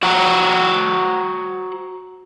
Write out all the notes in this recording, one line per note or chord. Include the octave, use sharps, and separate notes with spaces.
F#4 C5 F#5 G5 A#5